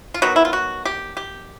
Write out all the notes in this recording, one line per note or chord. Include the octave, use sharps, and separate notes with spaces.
F4
D#3 F#3 B3 F#4
E4
F4
F#4
G4
G4